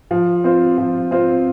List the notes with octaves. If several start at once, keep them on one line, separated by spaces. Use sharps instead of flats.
F3
C4 F4 C5
F3
C4 F4 C5